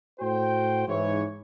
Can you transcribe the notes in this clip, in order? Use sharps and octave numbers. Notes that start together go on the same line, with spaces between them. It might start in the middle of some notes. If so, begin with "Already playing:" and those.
A2 F#4 C5 G5
G#2 E3 C#5